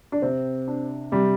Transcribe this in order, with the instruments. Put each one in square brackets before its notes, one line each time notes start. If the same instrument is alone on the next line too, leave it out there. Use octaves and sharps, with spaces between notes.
[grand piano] D4
[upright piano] C3 [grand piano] C4
[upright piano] D4
[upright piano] C3 [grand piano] G3